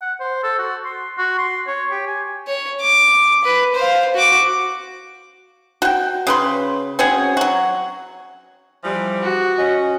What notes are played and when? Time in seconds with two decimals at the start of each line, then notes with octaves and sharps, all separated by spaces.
0.02 F#5
0.20 C5
0.44 A4
0.59 F#4
0.86 C6
1.18 F#4
1.39 C6
1.67 C#5
1.91 G4
2.07 G#5
2.47 C#5
2.81 D6
3.44 B4
3.75 C5 F5
4.14 F#4 D6
5.82 F#4 G5
6.27 C#3 B4 C6
6.99 C4 C#4 F#4 G#4
7.37 F#3 F#4
8.83 E3 F3 G3
9.23 F#4
9.57 C#4 D#5